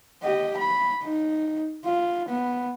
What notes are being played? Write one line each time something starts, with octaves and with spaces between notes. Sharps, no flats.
G4 D#5
B5
D#4
F4
B3